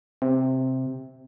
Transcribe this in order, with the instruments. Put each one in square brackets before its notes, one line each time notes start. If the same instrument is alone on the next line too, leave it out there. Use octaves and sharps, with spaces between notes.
[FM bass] C3